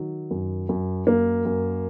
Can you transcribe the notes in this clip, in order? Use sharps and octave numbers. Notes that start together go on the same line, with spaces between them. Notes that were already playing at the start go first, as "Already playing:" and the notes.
Already playing: D#3 F#3
F#2
F#2
F#2 A#3
F#2